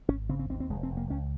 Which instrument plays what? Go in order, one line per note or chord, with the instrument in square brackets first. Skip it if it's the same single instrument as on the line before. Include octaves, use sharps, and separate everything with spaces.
[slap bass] G#1 C#4
C#3 C4
C4
D#2 C4
C4
F1 G#3
C4
F1
A#3
C#2 C#4